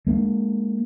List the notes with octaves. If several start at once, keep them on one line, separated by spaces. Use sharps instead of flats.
G#3 A#3 D4